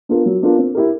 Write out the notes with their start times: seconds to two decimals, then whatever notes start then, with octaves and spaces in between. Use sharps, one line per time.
0.09 B3 D4 F4 A#4
0.26 F#3
0.42 B3 D4 F4 A#4
0.58 C4
0.75 E4 G4 A#4